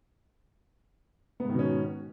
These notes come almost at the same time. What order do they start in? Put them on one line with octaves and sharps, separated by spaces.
B3 G#2 D#3 B2 C#4